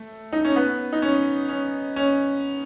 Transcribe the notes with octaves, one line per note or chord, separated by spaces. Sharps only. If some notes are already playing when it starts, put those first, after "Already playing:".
Already playing: A3
D#4
C#4
B3
D#4
C#4
C#4
C#4